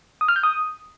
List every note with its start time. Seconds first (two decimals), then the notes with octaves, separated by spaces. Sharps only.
0.21 D#6
0.28 F6
0.36 G6
0.43 D#6